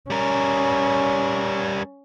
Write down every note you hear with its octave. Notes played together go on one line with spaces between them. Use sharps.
G3 C#4 A#4